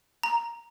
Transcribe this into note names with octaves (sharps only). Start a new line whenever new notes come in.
A#5